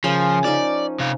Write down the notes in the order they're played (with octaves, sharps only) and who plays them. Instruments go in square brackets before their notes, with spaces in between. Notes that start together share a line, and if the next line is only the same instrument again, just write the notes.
[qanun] C#3 A#4 [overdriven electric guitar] F3
[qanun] F3 C#4 D#4 [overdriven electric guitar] D5
[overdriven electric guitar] C3 F5